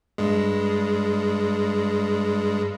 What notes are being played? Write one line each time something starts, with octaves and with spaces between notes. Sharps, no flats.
G2 G#3